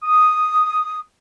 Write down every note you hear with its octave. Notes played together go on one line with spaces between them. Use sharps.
D#6